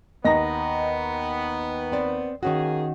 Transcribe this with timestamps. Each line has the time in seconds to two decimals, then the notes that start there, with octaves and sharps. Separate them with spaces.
0.25 D#2 B3 D#5 A#5 A#6
1.92 C4 D5
2.43 D#3 A#3 C#4 F#4 G#4